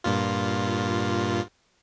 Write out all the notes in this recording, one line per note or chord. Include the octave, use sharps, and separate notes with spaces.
G2 A#2 F4